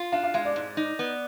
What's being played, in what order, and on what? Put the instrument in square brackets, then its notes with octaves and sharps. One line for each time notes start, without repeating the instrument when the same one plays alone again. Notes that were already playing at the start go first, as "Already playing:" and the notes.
Already playing: [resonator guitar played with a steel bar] F4
[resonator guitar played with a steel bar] D4 [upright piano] F5
[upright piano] F5
[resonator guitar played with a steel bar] G#3 [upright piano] F5
[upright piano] D5
[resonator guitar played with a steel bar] G#2
D#4
B3